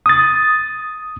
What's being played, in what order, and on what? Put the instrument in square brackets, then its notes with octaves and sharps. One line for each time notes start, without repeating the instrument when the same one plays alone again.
[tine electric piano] D#6 A6